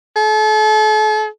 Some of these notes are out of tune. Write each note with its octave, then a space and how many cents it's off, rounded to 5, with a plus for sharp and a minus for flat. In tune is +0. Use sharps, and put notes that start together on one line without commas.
A4 -40